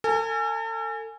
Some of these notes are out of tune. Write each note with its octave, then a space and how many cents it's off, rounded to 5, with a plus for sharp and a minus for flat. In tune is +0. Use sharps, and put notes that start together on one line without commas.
A4 +40 G#5 +0